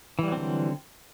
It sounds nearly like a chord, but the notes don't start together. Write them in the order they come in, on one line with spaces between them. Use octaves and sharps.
E3 G3 F#3 C4 D3